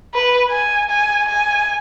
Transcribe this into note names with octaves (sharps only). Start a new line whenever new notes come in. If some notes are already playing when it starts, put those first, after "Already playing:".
B4
G#5
G#5
G#5